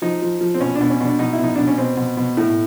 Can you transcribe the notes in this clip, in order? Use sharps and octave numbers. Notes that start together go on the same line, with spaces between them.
F3 D#4
F3
F3
C4
B2 C#4
D4
B2
C#4
B2 D4
B2 D#4
E4
B2
D#4
B2 D4
C#4
B2 C4
B2
B2
A2